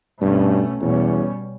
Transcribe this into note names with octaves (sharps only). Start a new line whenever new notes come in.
G2 B2 A3 C#4
E2 B2 G3 C#4